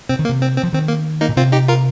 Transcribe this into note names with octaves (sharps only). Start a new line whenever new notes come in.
C3 C4
D#3
A#3
C3
C4
C4
F3
D#3 C4
A#3
A#3 D#4
A#2
C3 C4 F4
D#4 G4
F4 A#4